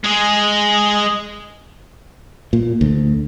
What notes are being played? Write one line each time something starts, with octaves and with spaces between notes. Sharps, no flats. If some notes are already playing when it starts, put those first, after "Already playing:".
G#3 G#4
A#2
D2